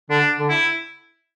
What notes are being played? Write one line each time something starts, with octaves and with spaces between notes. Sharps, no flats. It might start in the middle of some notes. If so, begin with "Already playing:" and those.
D3 D4
D3
E4